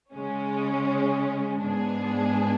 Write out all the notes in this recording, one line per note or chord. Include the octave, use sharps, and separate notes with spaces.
C#3 G#3 C#4
G#2 G#3 B3 D4 G#4